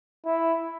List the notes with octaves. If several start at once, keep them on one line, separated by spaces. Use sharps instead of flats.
E4